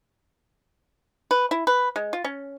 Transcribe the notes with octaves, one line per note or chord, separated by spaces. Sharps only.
B4
E4
B4
G#3
F4
C#4